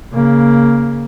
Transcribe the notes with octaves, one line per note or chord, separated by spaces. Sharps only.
C#3 A#3